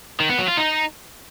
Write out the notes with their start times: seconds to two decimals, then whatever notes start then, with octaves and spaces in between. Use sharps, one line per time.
0.20 D#3
0.29 B3
0.39 F#3
0.48 F4
0.57 D#4